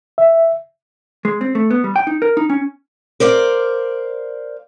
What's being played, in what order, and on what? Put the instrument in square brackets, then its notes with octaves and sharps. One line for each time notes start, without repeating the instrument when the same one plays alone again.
[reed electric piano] E5
[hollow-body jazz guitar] G#3
C4
A3
B3
G3
G5
D#4
A#4
D#4
C#4
[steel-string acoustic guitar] A#4 C5 D5 F5